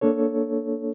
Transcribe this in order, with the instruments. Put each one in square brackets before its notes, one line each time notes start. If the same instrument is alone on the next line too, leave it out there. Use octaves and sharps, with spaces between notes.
[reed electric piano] A#3 D4 A4 C#5